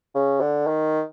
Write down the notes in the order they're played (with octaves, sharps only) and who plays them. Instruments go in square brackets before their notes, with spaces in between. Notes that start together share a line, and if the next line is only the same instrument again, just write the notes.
[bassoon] C#3
D3
D#3